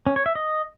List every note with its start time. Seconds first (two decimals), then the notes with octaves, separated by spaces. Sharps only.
0.07 C#4
0.16 C#5
0.26 E5
0.35 D#5